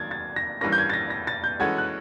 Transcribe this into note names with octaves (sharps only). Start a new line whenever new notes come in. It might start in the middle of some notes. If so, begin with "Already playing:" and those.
Already playing: D#3 F#3 A#3 G#6 A6
A6
A#6
G2 E3 G3 A#3 C#4 A#6
G6
G#6
A6
A#6
A#6
A6
G6
E3 G#3 C#4 F#4 A4 G#6
F#6